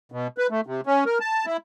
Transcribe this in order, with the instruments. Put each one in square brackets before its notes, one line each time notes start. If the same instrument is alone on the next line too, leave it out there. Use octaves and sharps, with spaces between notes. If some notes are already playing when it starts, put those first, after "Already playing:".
[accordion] B2
B4
A3
C3
C#4
A#4
A5
E4